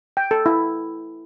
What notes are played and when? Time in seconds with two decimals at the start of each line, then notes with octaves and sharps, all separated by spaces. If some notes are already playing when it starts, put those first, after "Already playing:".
0.17 G5
0.31 A4
0.46 E4